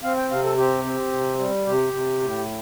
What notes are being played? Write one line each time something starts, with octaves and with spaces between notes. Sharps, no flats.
C4 F5
G5
C3 F5
A4
C4 G4
C4
C3
G3
C3 G4
C3
A2